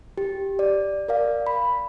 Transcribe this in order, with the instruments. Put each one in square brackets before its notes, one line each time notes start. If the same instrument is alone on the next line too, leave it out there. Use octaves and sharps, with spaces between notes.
[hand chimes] G4
D5
A#4 D5 F5
B5